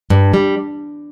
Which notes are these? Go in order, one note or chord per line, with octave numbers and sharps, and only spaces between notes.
G2
G3